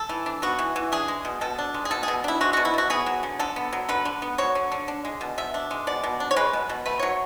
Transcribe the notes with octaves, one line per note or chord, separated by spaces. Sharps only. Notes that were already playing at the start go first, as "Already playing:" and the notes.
Already playing: A4
E3
D4
B3 F#4
E3
E3
D4 G#4
G#3
B2
B2 A4
D4
G#3
G#4
B2 A4
B2 G#4
D4 E4
G#3 F#4
B2 F#4
E4
B2 F#4
B3 G#4
F#3
D3
D3 A4
B3
F#3
D3 B4
D3
B3
F#3 C#5
D3
D3
D4
G#3
B2
B2 E5
D4
G#3
B2 D5
B2
D4
C#5
G#3 B4
B2
B2
A3 B4
F#3 C#5